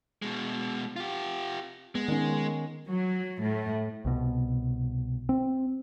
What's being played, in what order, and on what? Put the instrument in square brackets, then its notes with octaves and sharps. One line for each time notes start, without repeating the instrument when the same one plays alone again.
[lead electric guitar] B2 G#3
F4 G4
[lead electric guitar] G#3 [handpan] B3
[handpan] D#3 C#4
[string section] F#3
A2
[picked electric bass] C2 B2
C4